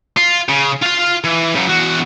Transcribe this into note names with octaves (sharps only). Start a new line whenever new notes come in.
F4
C#3
F4 F5
E3
C#3 F#3
E2 F#4